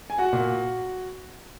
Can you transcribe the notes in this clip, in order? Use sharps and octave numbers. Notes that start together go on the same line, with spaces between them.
G#5
F#4 F#5
A#2